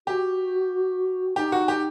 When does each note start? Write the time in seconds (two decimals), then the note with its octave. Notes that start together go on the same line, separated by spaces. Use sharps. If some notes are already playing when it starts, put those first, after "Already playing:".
0.07 F#4 G4
1.36 D#4 G4
1.52 F#4
1.68 G4